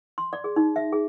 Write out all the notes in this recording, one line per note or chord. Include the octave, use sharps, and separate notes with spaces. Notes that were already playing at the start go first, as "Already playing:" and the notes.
C6
D5
G#4
D#4
E5
G#4